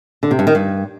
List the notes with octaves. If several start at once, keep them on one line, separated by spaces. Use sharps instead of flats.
D3
C3
G2
D#3
G2